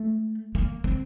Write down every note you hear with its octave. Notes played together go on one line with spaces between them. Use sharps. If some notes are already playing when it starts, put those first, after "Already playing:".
Already playing: A3
A#3
C4